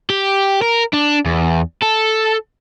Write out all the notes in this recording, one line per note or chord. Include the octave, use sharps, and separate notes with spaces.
G4
A#4
D4
E2
A4